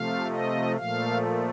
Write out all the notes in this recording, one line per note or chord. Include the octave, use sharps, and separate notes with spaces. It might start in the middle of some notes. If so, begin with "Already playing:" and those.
Already playing: C3 F3 A3 F5
D#5
A#2 F3 A3 F5